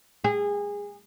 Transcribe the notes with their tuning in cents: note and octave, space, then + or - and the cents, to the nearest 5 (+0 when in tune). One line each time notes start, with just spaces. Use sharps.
G#4 -25